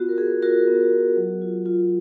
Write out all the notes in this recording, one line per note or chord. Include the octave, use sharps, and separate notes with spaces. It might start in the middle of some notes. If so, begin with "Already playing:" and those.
Already playing: B3 F4 F#4
A#4
B3 G#4
F4 F#4 A#4
B3
F4
F#3
F4
F4